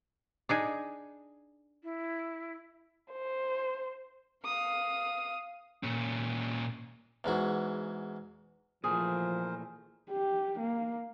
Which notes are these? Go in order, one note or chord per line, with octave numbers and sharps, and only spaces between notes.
D4 D#4 G#4
E4
C5
F5 D#6
A#2 C#4
E2 G#2 F#4
A#2 E3 F3 A3 G#4 A#4 C5
G4
A#3